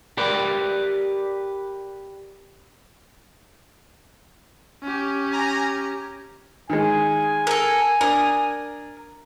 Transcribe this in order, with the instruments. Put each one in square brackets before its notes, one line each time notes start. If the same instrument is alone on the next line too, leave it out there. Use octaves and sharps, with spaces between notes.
[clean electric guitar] G4 A#4 B4 D5
[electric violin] C#4 G4
[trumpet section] G#5 A#5
[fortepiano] D#3 G#3 [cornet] G#5
[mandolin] A4 A#4
[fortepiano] D4 [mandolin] A#4 D#6